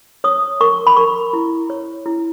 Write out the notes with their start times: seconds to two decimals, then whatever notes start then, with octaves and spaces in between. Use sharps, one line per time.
0.24 C#5 D#6
0.61 A#4 C#6
0.87 B5
0.97 A#4 C#6
1.33 E4
1.70 C#5
2.06 E4